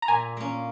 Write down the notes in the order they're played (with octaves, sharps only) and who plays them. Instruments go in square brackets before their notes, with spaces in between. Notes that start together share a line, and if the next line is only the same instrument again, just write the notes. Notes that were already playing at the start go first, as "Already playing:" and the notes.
[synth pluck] A#5
[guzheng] A#2 [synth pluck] G#5
[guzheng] A#3 C#4